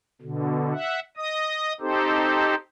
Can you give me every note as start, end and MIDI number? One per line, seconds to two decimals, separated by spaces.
0.22 0.73 47
0.22 0.73 50
0.73 1.00 76
0.73 1.00 78
1.17 1.73 75
1.17 1.73 87
1.80 2.55 60
1.80 2.55 63
1.80 2.55 67
1.80 2.55 69
1.80 2.55 72